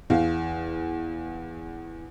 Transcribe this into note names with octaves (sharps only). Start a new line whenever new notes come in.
E2 F5